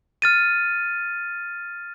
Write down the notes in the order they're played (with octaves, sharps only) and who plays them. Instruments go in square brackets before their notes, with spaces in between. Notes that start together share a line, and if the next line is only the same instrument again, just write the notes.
[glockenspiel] F6 A6 D#7